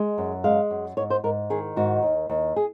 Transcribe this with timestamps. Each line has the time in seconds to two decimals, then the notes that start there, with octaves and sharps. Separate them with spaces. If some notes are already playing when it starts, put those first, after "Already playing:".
Already playing: G#3
0.18 F#2
0.44 G#3 F5
0.71 F#2
0.97 G#2 C#5
1.10 C5
1.23 G#2 A#4
1.50 D#3 G#4
1.76 G#2 F#4
2.02 D#2
2.29 D#2
2.56 G#4